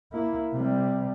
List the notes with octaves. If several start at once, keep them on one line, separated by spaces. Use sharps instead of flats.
A#3 E4
C3 G3